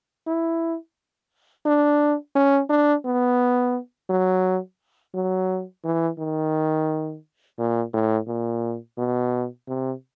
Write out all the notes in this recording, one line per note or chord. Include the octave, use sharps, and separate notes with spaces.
E4
D4
C#4
D4
B3
F#3
F#3
E3
D#3
A#2
A2
A#2
B2
C3